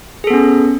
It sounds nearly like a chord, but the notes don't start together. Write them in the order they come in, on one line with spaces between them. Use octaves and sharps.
G#4 A4 B3 C#4